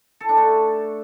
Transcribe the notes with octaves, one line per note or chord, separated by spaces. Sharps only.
A4
D4
A3